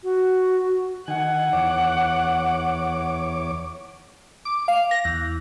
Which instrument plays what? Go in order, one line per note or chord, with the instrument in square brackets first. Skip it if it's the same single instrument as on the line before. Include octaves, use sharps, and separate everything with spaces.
[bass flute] F#4
[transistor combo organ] D#3 G#5 [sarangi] F#5
[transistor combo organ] E2 C#5 D6
[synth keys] D6
F5
A#6
E2